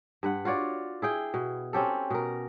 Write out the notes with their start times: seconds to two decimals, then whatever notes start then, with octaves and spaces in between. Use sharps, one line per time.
0.23 G2 B4 F#5
0.45 F4 F#4 C#5 D5
1.02 E4 G#4 G5
1.34 B2
1.73 C4 C#4 G4 A4
2.10 B2 A#4